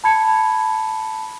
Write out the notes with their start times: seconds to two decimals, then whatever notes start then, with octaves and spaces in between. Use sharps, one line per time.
0.04 A5 B5 G#6 C#7